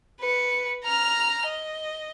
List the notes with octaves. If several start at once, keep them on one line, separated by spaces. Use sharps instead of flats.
B4 C#7
A#5 F6
D#5